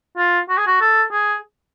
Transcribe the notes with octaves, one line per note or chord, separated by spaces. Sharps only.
F4
F#4
G#4
F#4
A4
G#4